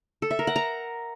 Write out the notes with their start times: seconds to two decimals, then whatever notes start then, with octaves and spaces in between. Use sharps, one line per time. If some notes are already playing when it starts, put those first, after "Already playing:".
0.22 A4
0.31 E5
0.39 A#4
0.47 F#5
0.56 A#5